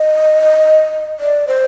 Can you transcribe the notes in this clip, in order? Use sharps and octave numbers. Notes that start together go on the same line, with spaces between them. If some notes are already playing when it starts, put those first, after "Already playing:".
Already playing: D#5
D5
C5